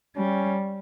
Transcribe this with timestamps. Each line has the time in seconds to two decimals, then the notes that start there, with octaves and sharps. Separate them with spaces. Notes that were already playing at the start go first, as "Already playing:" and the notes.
0.17 G3 C#4